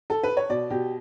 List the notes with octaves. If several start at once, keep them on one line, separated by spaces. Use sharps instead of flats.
A4
B4
C#5
B2 D5
B2 G4